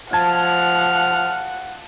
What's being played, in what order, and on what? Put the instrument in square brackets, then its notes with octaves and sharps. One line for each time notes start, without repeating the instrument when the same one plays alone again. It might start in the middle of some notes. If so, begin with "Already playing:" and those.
[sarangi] F3 [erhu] F#5 [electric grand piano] A5 G#6 [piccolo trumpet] F6